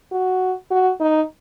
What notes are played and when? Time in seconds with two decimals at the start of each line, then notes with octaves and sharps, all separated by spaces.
0.12 F#4
0.71 F#4
1.01 D#4